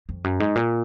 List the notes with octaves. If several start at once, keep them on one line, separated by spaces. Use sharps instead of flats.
F2
F#2
G#2
A#2